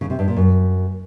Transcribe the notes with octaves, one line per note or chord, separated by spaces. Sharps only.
C#3
C3
G2
A#2
F#2